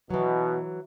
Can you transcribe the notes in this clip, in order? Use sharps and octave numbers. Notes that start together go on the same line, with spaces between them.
B2 E3 F#3